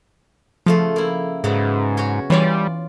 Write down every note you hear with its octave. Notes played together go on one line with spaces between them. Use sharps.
C#3 F3 A3 F4
A#3 E4
G#2 C#3 F#3 B3
C#4 F#4 C#5
E3 G3 F4 C#5 D5